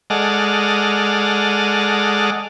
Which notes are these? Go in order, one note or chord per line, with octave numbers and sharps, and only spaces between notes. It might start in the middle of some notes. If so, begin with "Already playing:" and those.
G#3 A4 D5 D#5 F#5 F6